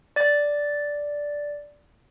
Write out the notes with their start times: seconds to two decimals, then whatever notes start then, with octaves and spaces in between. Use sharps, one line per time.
0.16 D5 A6